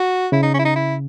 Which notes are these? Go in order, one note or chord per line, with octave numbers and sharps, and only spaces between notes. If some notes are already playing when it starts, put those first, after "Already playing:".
Already playing: F#4
C#3 E4
D#4
C#4
E4
D#4
E4